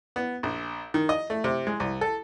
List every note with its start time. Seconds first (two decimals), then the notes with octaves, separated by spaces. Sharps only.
0.16 B3
0.43 A#1
0.94 D#3
1.09 D#5
1.30 A3
1.44 C3
1.67 G#3
1.80 C2
2.01 A4